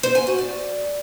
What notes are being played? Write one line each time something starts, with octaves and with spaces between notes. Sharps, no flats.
C5
G#5
F#4
D5